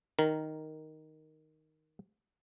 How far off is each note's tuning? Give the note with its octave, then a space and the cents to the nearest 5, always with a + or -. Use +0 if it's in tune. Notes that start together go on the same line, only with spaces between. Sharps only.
D#3 +0 A#4 +0